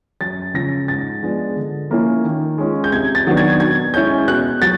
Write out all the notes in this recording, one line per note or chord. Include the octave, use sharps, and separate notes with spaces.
F#2 A6
C#3 F3 A#6
G#2 A6
F3 G#3 B3 D4
D3
F3 A#3 C#4 E4
D#3
G#3 C#4 F4
G6
C3 G#6
A6
D#3 F#3 B3 D4
G#6
B2 G#6
G#3 C#4 E4 G6
B2 F#6
F#3 A6